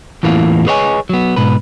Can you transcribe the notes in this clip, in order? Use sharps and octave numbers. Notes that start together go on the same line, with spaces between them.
E2 A2 E3 A#3 F4
G#4 B4 C#5 D#5 F5 G#5
F#3 B3
G#2 B2 B4